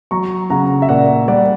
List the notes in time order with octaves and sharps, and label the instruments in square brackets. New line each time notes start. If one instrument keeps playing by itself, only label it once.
[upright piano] F#3 [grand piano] A#5 C#6
[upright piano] C#3 [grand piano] F#5 A#5
[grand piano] E5
[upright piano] A#2 [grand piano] D5 F#5
[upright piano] G3 [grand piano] D5 F#5